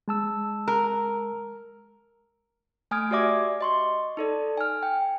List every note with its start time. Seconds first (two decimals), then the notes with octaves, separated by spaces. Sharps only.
0.08 G#3 A5 E6
0.67 A#4
2.91 A3 G#5 D#6 F6 G#6 D7
3.11 F#4 G4 D5 E5 D6
3.61 D#5 C6 C#6
4.17 D#4 A4 D5
4.57 G#5 F6
4.83 G5